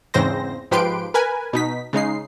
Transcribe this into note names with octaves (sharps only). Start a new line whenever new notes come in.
E2 G#2 C#3 C4 C5 A#6
G#2 F3 G4 B4 C6 D7
A#4 B4 G#5
B2 D#4 B6
C#3 G#3 D#4 C7